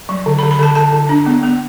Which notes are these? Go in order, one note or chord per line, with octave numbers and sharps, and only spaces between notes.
F#3
D3
B5
D3
B5
D3 A5
D3 A5
D3
D4
B3
B3